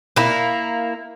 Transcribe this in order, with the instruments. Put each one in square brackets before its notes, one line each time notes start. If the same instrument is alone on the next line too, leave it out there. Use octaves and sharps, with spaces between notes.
[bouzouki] A#3 E4